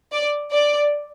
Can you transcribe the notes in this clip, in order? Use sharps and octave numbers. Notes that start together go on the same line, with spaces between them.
D5
D5